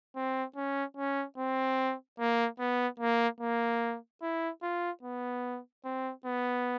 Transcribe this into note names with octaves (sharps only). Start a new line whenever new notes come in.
C4
C#4
C#4
C4
A#3
B3
A#3
A#3
E4
F4
B3
C4
B3